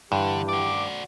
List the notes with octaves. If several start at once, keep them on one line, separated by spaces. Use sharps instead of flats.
G2 D3 E3 G4
F#4 D5 D6